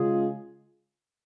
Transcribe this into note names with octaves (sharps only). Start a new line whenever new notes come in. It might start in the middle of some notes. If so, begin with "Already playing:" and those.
Already playing: C#3 G#3 F4 G#4